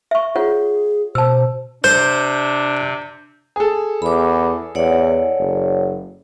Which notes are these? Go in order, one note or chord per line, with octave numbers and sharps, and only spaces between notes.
E5 C#6
F4 G#4 C#5 F#5
B2 C5 A5 E6
C3 D4 C5 G6
G#4 A4
E2 B5 D6
E2 C#5 D5 F#5
F#1